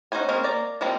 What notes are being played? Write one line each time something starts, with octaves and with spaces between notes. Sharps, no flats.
C#4 D#4 F#4 C5 G#5
G#3 A#3 C4 C#4
A#3 D5 A#5
F3 G3 G#3 A#3 C4